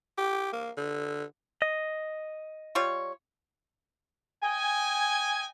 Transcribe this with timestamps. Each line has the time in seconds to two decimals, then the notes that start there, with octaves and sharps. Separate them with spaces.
0.18 G4
0.53 A#3
0.77 D3
1.62 D#5
2.75 G3 F4 C#5
4.42 D#5 G5 G#5